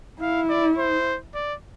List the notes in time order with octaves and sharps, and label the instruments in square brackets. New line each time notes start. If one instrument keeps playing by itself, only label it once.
[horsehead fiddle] E4 [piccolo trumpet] F5
[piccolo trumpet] D5
C5
D5